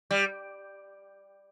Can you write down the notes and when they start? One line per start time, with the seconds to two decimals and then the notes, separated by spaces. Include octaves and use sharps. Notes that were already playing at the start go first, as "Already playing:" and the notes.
0.11 G3